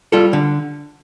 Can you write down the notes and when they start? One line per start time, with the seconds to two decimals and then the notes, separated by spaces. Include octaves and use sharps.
0.12 G3 F4 A4
0.33 D3